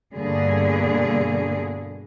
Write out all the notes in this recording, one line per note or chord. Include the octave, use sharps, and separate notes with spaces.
G2 B2 D3 A#3 G#4